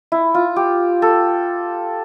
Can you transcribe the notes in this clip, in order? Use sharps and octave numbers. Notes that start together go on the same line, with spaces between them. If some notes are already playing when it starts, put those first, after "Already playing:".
E4
F4
G4
A4